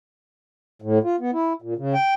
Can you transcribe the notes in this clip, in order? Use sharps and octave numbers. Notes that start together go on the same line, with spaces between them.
A2
F4
B3
E4
A#2
C#3
G5